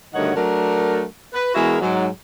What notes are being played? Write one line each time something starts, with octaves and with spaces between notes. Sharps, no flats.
D2 G2 D#3 D#4 C#5 F#5
F#3 A3 D4 A#4
B4
E2 G#3 E4 F#4 G#4 A#4
G#2 F#3